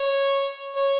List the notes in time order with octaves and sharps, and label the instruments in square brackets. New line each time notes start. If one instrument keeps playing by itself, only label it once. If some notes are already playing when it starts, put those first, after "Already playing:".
Already playing: [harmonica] C#5
C#5